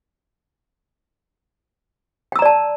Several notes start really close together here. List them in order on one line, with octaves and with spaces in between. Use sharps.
G5 E6 A#5 D5 A5